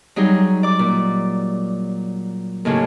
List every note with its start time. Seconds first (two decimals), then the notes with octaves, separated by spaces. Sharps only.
0.16 F#3 G3 D#4 G#4
0.63 D5 D6
0.79 A#2
2.65 D#2 A2 C#3